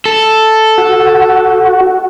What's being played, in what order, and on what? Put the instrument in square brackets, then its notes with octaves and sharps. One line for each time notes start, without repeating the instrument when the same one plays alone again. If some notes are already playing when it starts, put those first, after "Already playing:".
[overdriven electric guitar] A4
[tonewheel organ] F#4